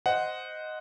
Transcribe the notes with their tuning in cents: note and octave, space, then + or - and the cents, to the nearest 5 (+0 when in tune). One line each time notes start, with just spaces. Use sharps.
C5 -10 D#5 +0 F#5 +0